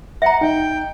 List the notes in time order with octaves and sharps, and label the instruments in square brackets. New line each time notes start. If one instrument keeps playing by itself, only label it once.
[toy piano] E5 A#5 [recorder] F#5
[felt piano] D#4 [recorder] G5